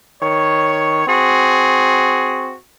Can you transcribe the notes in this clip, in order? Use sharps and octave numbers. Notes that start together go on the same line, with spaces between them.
D#3 C#5
C4 F#4 G#4